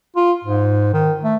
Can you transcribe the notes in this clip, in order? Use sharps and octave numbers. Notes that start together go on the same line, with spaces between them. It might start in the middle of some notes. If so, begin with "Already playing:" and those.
F4
G#2
D#3
A3